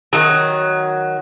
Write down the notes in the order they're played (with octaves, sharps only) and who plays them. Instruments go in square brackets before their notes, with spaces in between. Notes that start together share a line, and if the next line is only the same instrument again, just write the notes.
[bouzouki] D#3 F#3